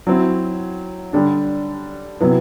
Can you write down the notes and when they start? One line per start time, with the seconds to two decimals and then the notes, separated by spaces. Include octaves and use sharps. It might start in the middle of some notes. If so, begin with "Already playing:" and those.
0.07 F#3 C4 E4
1.13 D3 G3 D4
2.21 C3 F#3 B3 E4